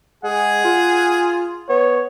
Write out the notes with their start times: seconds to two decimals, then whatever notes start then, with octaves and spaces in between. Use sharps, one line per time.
0.24 G#3 G#4 F#5
0.64 F4
1.69 B3 C#5